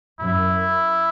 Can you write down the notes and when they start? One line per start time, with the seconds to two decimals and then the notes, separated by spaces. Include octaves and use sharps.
0.20 F#2 E4